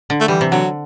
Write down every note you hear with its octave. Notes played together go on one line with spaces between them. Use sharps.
D3
A3
E3 G3
C3
D3 F#3